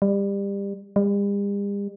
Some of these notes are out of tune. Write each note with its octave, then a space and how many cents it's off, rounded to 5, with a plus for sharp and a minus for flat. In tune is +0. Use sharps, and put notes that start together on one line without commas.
G3 +25
G3 +45